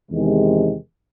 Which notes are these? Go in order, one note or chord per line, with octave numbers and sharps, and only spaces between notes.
E2 C3 D#3 G#3